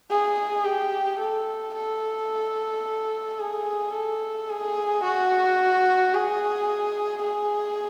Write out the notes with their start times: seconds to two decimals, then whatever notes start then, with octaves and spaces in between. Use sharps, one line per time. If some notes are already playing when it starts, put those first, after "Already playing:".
0.10 G#4
0.64 G4
1.19 A4
1.74 A4
3.39 G#4
3.93 A4
4.49 G#4
5.04 F#4
6.14 G#4
7.23 G#4